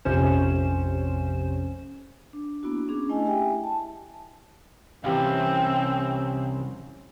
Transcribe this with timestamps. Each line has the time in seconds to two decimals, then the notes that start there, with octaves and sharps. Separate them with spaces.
0.05 A#1 F2 C3 C#4 C5 E7
2.33 D4
2.63 A#3 B3 D4 E4 F#4
2.88 C#4 D4 G#4
3.09 A3 E4 D#5 G#5
3.25 E4 G4 E5 G5 G#5
3.64 A5
5.04 C2 E3 C4 C#4 G4 F5